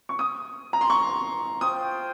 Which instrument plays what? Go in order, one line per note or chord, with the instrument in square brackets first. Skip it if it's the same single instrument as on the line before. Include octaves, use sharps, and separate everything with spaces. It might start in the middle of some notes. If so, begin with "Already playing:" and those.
[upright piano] C#6
D#6
A#5
C6
C#6
[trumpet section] F4 C5 G5 [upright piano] D#6